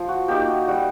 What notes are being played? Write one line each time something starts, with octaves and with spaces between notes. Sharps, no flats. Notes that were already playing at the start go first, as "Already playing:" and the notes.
Already playing: F3
F#4
A#3 D#4 G4
F#4
G3 F#4